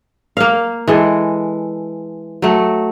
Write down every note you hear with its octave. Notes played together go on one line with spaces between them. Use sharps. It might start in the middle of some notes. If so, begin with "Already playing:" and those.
A#3 F5
E3 G#3 A4
F#3 A3